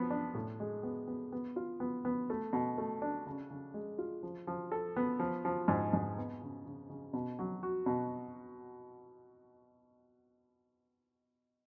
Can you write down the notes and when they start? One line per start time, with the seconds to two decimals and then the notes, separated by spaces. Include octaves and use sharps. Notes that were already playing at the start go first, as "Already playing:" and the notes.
Already playing: F3 B3
0.10 D4
0.35 A2
0.60 G#3
0.83 B3
1.07 B3
1.32 B3
1.56 F4
1.80 B3
2.05 B3
2.30 A3
2.53 B2
2.78 A3
3.02 D4
3.27 C#3
3.50 C#3
3.74 G#3
3.98 F4
4.23 F3
4.47 F3
4.72 A4
4.96 B3
5.19 F3
5.45 F3
5.68 G#2
5.93 G#2
6.18 B3
6.41 C#3
6.66 C#3
6.90 C#3
7.13 B2
7.39 F#3
7.63 F#4
7.86 B2